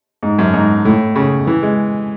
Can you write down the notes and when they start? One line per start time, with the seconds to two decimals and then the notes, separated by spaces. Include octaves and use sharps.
0.23 G#2
0.39 F#2
0.54 G#2
0.85 A2
1.16 C#3
1.47 E3
1.63 G#3